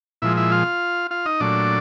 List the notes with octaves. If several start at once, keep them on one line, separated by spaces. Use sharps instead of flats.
A#2 F3 G#3 E4 E5
E4 E5
F4 F5
F4 F5
D#4 D#5
A#2 F#3 A3 D4 D5